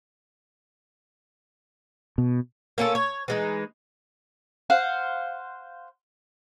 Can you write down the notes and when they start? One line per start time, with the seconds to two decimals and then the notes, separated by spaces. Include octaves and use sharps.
2.18 B2
2.78 A#3 C#4 F4 A4
2.95 C#5
3.28 E3 G#3 D#4
4.70 C5 F5 F#5